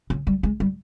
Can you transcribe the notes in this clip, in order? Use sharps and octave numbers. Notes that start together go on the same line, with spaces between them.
C#3
G3
G#3
G3